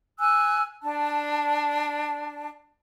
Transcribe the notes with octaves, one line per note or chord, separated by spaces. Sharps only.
G#5 E6 F#6
D4 A5